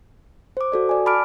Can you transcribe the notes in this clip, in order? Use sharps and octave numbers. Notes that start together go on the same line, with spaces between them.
C5 D6
F#4 A4 D5
D5 G#5
A5 B5 D6 F6 D7